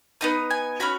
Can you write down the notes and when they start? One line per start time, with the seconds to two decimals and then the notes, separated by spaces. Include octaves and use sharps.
0.21 B3 D#4 D#6
0.51 G#5
0.80 C#4 F#4 B5